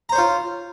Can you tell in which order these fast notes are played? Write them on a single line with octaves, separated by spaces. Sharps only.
A#5 C5 C#5 F4